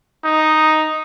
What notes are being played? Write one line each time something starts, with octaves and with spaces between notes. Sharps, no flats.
D#4